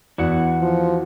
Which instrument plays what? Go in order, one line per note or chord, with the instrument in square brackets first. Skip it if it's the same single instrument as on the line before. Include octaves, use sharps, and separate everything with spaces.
[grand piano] E2 [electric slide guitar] E4 F#4 F#5
[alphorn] F3